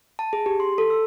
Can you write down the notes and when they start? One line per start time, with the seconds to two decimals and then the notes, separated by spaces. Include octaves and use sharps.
0.19 A5
0.33 G#4
0.46 G4
0.60 C6
0.78 A4
0.90 E6